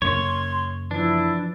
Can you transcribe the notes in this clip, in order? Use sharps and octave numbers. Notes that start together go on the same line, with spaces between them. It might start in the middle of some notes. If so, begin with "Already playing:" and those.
F#2 C#3 A#3 C#5 C6
E3 F3 D4 E4